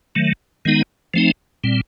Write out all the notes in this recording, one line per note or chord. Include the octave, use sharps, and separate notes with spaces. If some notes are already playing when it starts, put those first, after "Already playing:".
D#3 F#3 A3
D#3 G#3 B3 D#4
F3 A3 C4 D#4
A#2 G3 C4